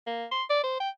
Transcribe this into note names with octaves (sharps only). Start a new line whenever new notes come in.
A#3
C6
D5
C5
G5